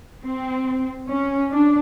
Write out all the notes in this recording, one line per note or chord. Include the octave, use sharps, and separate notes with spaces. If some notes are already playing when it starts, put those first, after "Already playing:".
C4
C#4
D4